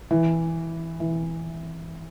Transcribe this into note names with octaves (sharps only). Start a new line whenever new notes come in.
E3
E3